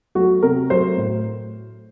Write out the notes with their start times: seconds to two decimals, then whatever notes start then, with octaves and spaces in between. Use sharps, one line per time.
0.15 F#3 A3 F#4
0.43 C3 A#4
0.70 F#3 A3 C5
0.97 A2